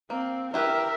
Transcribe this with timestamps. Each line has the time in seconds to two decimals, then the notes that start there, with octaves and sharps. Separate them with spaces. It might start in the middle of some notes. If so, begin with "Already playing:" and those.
0.10 A#3 C4
0.54 E4 G4 A#4 B4 E5